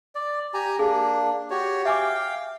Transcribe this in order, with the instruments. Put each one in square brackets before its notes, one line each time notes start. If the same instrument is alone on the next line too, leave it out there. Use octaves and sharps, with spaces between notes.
[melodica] D5
G4 G#5 A#5
[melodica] A#3 D4 [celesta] G#4
[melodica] F#4 G4 C#5
[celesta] E5 G#5 D6 [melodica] F5 G5